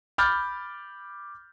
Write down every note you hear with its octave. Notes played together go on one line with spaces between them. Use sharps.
B5 D6 F6 G6 A6